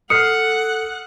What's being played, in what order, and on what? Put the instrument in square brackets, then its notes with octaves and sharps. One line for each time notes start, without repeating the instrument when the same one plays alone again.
[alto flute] A4 [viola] F#5 [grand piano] D#6 F6 C7 [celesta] C#7